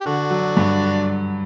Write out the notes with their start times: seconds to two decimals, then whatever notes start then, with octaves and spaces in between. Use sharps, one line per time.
0.01 G4
0.05 D3 D4 F#4
0.31 F#3
0.57 G2